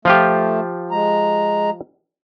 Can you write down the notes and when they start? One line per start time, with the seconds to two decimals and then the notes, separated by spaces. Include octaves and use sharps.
0.05 F3 A3 F4 G4
0.91 G#3 A#5